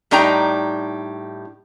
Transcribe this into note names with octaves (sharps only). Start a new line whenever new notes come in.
A2 G3 D4 D#4 G5 A#5